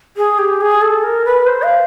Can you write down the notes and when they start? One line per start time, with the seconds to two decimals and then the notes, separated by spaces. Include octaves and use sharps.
0.17 G#4
0.38 G4
0.61 G#4
0.82 A4
1.04 A#4
1.25 B4
1.47 C5
1.63 F5